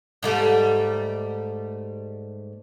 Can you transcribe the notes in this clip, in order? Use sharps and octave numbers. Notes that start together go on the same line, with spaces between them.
G#2 G3 A3